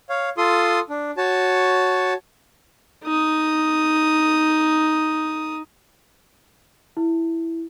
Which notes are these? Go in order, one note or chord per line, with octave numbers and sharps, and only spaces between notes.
C#5 F5
F4 A4 C6 D#6
D4
F#4 C#5 A5
D#4 D#6
E4